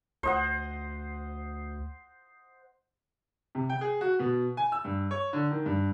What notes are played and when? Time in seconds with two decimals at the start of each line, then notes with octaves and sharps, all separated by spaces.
0.23 D2 C5 D#5 F#5
3.55 C3
3.70 G5
3.81 G#4
4.01 F#4
4.19 B2
4.57 G#5
4.72 E6
4.84 G2
5.11 C#5
5.33 D3
5.51 D#3
5.66 G2